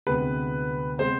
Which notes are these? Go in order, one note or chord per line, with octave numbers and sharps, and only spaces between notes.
D2 C3 G#3 B3 B4
C3 G#3 B3 C5